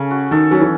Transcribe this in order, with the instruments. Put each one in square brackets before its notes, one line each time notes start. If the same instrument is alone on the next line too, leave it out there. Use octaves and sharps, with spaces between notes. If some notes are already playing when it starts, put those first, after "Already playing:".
Already playing: [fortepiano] C#3 [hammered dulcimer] C#4 A4
[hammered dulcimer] F#4
[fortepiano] D#3 [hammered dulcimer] A4
[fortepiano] F#3 [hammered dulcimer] C#4
[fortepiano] E3